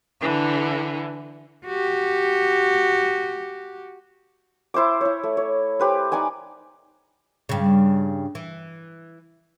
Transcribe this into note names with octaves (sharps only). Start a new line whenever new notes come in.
D3 E3
F#4 G4
E4 C5 E5 D6
E4 C#5
A3
C#5
G4 B4 C5
D#4 D5 G5 G#5
G2 C#3
E3